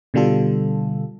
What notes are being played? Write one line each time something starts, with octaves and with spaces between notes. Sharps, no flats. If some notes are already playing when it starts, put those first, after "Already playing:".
B2 D3 G3 F4 A4